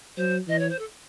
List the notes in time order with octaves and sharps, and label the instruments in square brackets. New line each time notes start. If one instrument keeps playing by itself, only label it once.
[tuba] F#3 [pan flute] C5
[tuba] E3 [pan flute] D#5
[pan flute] C#5
C5
A4